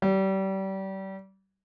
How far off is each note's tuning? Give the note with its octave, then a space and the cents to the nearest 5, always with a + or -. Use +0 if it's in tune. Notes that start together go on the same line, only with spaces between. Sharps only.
G3 -30